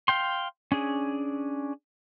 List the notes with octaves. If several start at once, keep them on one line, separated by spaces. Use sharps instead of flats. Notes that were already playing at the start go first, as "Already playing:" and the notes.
F5 G5 C6
C#4 D4 G#4